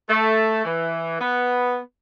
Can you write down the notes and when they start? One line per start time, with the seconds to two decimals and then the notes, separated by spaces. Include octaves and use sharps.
0.09 A3
0.65 E3
1.20 B3